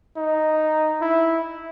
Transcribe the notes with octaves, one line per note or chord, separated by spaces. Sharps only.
D#4
E4